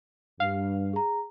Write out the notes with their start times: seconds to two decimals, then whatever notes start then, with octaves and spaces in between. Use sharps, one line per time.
0.40 G2 F5
0.93 G#4 A#5